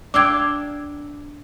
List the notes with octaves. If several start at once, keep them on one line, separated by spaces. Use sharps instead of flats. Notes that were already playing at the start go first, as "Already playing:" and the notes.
D4 F5 G5 D6 E6 G#6